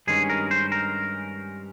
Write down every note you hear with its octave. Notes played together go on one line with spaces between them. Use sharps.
G2 D#3 G#3 C#4 G#4
A#4
C5
A#4